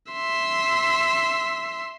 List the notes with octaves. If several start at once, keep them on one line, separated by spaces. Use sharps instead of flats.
E5 C6